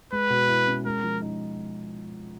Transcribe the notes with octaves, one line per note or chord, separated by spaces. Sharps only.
G#3 B4
B2
E4
C#4
G#3 A#4
F3
D#4